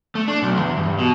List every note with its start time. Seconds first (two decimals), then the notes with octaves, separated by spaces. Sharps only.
0.15 A3
0.28 D4
0.43 B1
0.59 E2
0.77 G2
0.99 B2